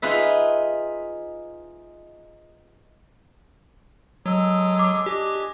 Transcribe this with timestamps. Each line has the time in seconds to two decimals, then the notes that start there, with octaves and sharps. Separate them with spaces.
0.02 D#4 F4 G#4 B4 E5
4.26 F#3 G#3 A4 D#6
4.79 D6
5.06 D4 G4 D#5 G#5